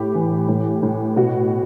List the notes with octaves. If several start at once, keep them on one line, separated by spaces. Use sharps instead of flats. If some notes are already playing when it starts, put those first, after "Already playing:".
Already playing: A2 G4
E3
A2
A2
B2 F#4